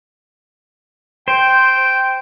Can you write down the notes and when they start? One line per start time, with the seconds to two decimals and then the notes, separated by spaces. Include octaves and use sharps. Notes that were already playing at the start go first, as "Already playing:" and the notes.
1.28 C5 G5